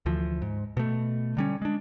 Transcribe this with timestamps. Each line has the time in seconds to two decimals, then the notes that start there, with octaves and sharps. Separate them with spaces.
0.06 D2 E3 F3
0.42 G#2
0.77 B2 A3
1.37 D3 G3 C#4
1.62 G#3 D4